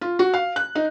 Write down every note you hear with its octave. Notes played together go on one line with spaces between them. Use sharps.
F4
F#4
F5
F#6
D#4